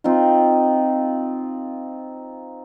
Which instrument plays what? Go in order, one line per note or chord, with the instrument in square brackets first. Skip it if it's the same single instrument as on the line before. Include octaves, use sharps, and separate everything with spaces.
[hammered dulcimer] C4 D#4 F4